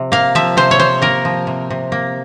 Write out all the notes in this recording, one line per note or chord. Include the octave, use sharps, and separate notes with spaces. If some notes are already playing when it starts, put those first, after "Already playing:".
Already playing: C3 F3
A#3 F5
F3 E5
C3 C5
C#5
C3 C5
A#3 A#4
F3
C3
C3
A#3